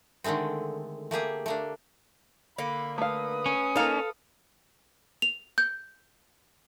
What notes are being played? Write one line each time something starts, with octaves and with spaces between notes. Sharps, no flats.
D3 D#3 G#3 A3 C4
A3 A#3 G4 G#4
A3 A#3 D4
D3 A#3 B5
A3 B4 F5 D#6
C#4
A#3 D#4 A4 F5
F7
G6